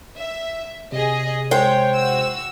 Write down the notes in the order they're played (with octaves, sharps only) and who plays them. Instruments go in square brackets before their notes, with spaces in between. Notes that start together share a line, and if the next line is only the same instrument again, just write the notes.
[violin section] E5
[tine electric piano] C3 [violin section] G#4 D#5
[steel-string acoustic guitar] G#3 C5 G5 [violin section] C#5
[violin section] F#4 E6